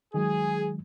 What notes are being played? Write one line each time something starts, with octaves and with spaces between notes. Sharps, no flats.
D#3 F#3 G#3 G#4